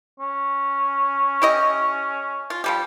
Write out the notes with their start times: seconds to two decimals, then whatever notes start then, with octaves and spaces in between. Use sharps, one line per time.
0.20 C#4
1.42 E4 G4 D#5
2.50 F4
2.64 F3 G3 G4